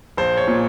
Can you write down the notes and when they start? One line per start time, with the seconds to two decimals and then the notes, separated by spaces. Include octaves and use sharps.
0.17 A#1 C5
0.37 C#5
0.48 A#2